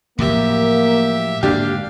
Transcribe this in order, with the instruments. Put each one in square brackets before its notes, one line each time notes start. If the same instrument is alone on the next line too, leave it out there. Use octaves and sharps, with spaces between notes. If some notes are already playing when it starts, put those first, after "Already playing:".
[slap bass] A2 F3 F#3 [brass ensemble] A#3 [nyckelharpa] G4 E5
[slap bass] G#2 D3 A#3 [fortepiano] D4 G4 [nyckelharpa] F5